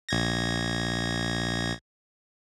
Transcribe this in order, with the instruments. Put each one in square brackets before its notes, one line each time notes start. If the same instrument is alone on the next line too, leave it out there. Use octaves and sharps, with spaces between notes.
[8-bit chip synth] A#1 G#6 A#6